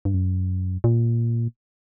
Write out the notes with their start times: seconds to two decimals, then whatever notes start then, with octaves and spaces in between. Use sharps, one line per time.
0.05 G2
0.14 F#2
0.84 A#2